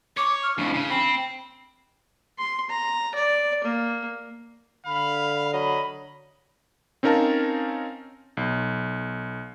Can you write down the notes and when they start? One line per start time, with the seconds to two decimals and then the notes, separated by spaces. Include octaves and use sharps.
0.17 C#5 D6
0.43 F6
0.58 F2 A2 D4
0.73 C#3
0.90 C4 B5
2.38 C6
2.70 A#5
3.15 D5
3.64 A#3
4.86 D3 F5 B5
5.53 F#3 D#5 B5
7.03 C4 C#4 D#4 A#4 F5 A5
8.37 B1